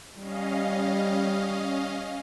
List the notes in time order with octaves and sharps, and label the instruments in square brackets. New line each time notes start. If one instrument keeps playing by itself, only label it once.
[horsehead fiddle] G3 [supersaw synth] C#4 D#5 F5